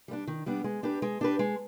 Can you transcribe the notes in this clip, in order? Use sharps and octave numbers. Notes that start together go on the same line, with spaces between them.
G3 B3 D4
D#3
G3 B3 D4
G#3
D4 G4 B4
G#3
D4 G4 B4
G#3